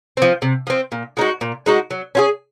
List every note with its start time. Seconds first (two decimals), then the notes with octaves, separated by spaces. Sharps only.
0.17 F3 C4
0.42 C3
0.67 F3 C4
0.92 A#2
1.17 G#3 D#4 F#4
1.41 A#2
1.66 G#3 D#4 F#4
1.91 F#3
2.15 C#4 F4 G#4